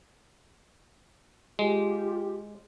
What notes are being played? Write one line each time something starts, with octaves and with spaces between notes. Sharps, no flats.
G#3 F4 G4